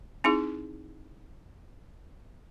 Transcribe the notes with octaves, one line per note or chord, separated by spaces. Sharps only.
C4 D#4 E4 G#4